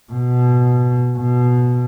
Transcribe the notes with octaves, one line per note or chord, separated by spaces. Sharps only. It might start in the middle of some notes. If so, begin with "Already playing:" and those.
B2
B2